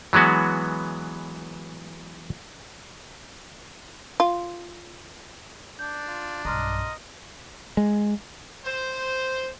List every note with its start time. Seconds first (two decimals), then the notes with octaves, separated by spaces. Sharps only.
0.13 E3 F#3 G#3 B3 F#4
4.20 F4
5.79 D4 G6
6.08 F4
6.45 B1 G2 D#5 A#5 C6 F6
7.77 G#3
8.66 C5